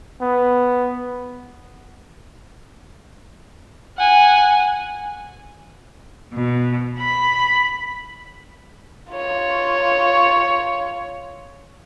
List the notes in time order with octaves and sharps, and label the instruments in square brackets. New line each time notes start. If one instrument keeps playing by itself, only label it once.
[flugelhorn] B3
[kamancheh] F#5 G#5
[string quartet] B2
B5
[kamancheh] F4 C#5